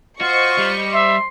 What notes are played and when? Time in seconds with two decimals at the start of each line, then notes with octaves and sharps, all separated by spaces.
0.21 F4 F#4 C5 D#5 C#6
0.58 G3
0.93 E5 C6